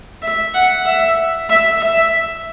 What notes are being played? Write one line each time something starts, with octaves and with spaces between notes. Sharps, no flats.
E5
F#5
E5
E5
E5